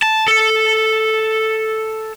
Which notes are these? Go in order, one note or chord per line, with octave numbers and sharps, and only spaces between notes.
A5
A4